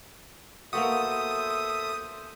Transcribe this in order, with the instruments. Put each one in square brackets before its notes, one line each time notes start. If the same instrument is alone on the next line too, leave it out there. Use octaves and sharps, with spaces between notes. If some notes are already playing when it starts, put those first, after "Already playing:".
[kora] A#3 B3 F#4 [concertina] A4 C5 E5 [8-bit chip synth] D#6